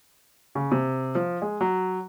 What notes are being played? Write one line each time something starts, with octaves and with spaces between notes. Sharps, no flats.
C#3
C3
F3
G#3
F#3